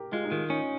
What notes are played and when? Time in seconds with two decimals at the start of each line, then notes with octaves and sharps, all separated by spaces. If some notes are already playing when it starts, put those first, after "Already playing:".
Already playing: G4 A#4
0.12 G#3 F4
0.25 D#4
0.31 D#3 F4
0.50 C#4 D#4